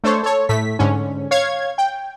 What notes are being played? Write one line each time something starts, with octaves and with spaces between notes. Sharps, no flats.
A3 D4 A4 C5 C#5
A4 C#5
A2 A3 B6
G#2 D3 C#4
C#5 F5 G#6
G5